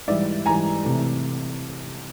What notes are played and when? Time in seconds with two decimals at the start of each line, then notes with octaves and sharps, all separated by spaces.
0.08 G#2 E3 G3 D5 E5
0.46 G#2 E3 G3 G#5 A#5
0.84 C3 E3 A3